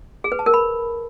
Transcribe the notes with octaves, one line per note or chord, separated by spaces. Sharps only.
G#4
B4
A5
A#4
B5